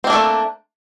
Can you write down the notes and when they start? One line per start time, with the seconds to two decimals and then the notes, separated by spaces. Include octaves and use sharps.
0.04 C4
0.07 A#3
0.10 D4
0.13 A3